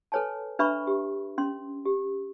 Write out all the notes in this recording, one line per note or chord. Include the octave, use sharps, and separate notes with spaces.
A4 B4 C#5 G#5 A5
D4 B4 E5 A#5 B5 C#6
G4
C#4 C6
G4